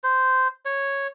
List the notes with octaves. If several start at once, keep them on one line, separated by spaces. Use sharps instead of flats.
C5
C#5